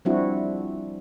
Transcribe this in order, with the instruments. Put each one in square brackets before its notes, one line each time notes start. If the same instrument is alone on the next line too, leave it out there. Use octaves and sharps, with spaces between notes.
[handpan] F3 G3 C4 D4 E4 F#4